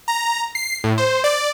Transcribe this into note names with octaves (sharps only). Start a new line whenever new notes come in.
A#5
C7
A2
C5
D5